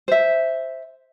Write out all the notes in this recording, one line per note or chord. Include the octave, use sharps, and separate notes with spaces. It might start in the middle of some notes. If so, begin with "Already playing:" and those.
C5 E5